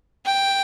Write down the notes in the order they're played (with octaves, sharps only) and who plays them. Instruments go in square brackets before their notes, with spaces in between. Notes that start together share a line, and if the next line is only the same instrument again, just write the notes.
[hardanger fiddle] G5